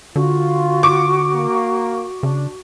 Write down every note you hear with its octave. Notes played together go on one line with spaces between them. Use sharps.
D3 F4 F#4
C#6 D6
A#3
C#3 D4